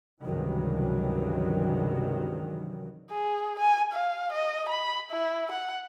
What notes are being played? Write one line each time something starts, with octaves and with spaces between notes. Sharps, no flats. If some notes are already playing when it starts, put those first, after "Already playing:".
C#2 G2 C3 D#3 E3 F#3
G#4
G#5
F5
D#5
B5
E4
F#5